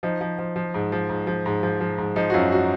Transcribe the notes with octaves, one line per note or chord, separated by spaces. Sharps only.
F3 D#4
F3
F3
F3
G#2
F3
G#2
F3
G#2
F3
F3
G#2
F3 D#4
F#4
F#2 F4
F#4